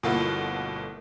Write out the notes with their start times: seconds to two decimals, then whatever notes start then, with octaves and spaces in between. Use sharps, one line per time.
0.03 G1 B2 A3 A#3 E4 F4 A4 F#5